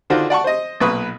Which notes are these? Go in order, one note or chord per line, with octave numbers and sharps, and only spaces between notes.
D3 D#3 D4 F4 F#4 C5
D5 F#5 A5 C#6
C5 D#5
B1 A#2 B4 C#6 D#6